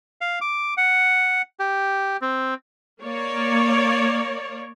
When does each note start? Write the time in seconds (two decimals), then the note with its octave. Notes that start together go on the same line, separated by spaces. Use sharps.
0.21 F5
0.41 D6
0.77 F#5
1.60 G4
2.21 C4
3.02 A#3 C#5 D5